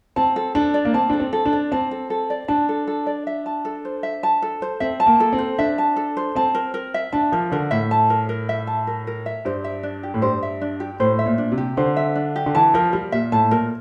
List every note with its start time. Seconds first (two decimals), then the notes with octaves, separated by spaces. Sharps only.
0.16 C4 A5
0.36 A4
0.55 D4 A4
0.74 D5
0.85 A#3
0.94 C4 A5
1.10 D4 A4
1.20 C4
1.33 A4
1.45 D4
1.53 D5
1.72 C4 A5
1.91 A4
2.10 A4
2.30 D5
2.48 D4 A5
2.69 A4
2.87 A4
3.06 D5
3.27 E5
3.46 A5
3.65 A4
3.85 C5
4.03 E5
4.23 A5
4.42 A4
4.62 C5
4.80 C4 E5
5.00 A5
5.06 A#3
5.20 A4
5.33 C4
5.38 C5
5.58 D4 E5
5.78 A5
5.96 A4
6.17 C5
6.35 C4 A5
6.55 A#4
6.74 A#4
6.94 E5
7.12 D4 A5
7.32 F3 A#4
7.52 D3 A#4
7.71 A2 E5
7.91 A5
8.10 A#4
8.29 A#4
8.49 E5
8.67 A5
8.87 A#4
9.07 A#4
9.26 E5
9.45 G2 C5
9.64 E5
9.83 D4
10.03 G4
10.14 A2
10.22 G2 C5
10.43 E5
10.61 D4
10.80 G4
11.00 A2 C5
11.19 E5
11.26 A#2
11.38 D4
11.52 C3
11.58 G4
11.77 D3 C5
11.96 E5
12.15 D4
12.36 G4
12.46 D3
12.55 E3 A5
12.74 F3 A#4
12.93 G3 A#4
13.12 A#2 E5
13.32 A2 A5
13.51 A#2 A#4